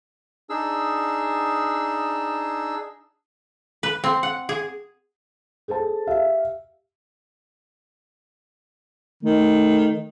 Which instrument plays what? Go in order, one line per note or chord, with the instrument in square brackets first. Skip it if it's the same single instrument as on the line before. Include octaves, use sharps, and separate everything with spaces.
[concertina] D4 D#4 G#4 E6
[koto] B4
C4
F#5
G#4
[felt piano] G#4 A4 C5 A5
G4 E5 F5
[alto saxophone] D#3 [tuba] A3